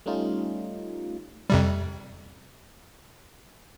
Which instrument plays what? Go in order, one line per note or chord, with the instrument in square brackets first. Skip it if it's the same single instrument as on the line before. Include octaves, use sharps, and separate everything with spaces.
[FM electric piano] G3 A3 C#4 D#4 F4
[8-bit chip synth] F2 C3 G3